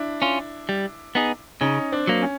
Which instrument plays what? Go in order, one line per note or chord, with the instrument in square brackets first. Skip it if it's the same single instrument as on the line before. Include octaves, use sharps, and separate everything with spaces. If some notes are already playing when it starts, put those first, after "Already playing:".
Already playing: [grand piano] D4 E4
[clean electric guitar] C#4 F4
G3
B3 D#4 G#4
[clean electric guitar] C#3 [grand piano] C#4 D#4
[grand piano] C4 D4
[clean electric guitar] F#3 A#3
[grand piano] C#4